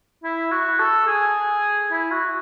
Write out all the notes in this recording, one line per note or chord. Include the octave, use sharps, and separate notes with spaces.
E4
F#4
A4
G#4
E4
F#4